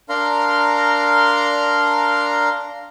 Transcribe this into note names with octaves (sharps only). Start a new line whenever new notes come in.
D4 A#4 F5 A#5 C6